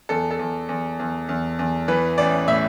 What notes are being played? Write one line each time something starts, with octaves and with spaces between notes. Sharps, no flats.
E2 A4
A4
E2
E2
E2
E2
E2
E3 B4
A1 D5
A2 E5